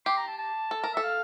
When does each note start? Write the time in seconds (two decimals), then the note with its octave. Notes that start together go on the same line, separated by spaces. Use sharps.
0.06 G4 C6
0.17 A#5
0.28 A5
0.38 A5
0.71 A4
0.84 A#4
0.93 A4 E5
1.03 F5